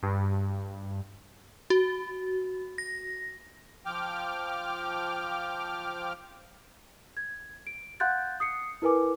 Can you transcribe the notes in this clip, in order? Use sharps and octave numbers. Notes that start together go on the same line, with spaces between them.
G2
F#4
A#6
F3 G5 D6 F6
G#6
D7
F5 F#5 C6 F#6 G6 A6
D#6 C7 C#7
E4 A#4 B4 G#5 D6